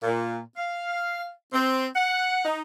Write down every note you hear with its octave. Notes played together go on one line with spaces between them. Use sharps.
A#2
F5
C4
F#5
D#4